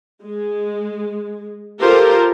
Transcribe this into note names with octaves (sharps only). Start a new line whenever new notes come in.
G#3
F4 G4 A4 A#4 C5